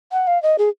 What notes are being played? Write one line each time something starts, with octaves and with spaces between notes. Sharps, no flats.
F#5
F5
D#5
G#4